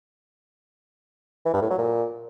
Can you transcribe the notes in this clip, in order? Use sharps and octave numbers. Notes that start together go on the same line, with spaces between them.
E3
G2
A2
F#3
A#2